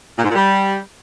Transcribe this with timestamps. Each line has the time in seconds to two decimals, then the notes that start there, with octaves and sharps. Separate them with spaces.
0.17 A#2
0.23 G#2
0.29 A#2
0.35 G3